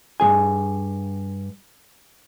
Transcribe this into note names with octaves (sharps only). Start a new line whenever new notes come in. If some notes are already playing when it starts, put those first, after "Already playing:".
G2 E3 G#4 G#5